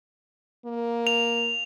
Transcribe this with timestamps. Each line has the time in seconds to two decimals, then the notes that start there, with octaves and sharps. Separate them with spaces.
0.65 A#3
1.07 F7